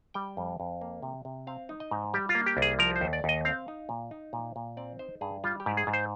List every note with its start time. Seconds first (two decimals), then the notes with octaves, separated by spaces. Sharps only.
0.14 G3 G5
0.37 F2
0.60 F2
0.81 A#3
1.02 C3
1.25 C3
1.47 C4 F5
1.69 D#4
1.80 D#5
1.91 G#2
2.14 G3 G4
2.29 F4
2.35 A#3
2.46 G4
2.57 C2
2.62 G#4
2.79 F3 A#4
2.96 C5
3.01 D#2
3.13 D5
3.24 D#2 D#5
3.45 C4 F5
3.68 D#4
3.89 A#2
4.11 D#4
4.33 A#2
4.56 A#2
4.77 C4 D5
4.99 D#4 C5
5.21 G2 G#4
5.44 G3 F4
5.60 G4
5.66 G#2
5.77 G#4
5.87 G#2
5.93 C5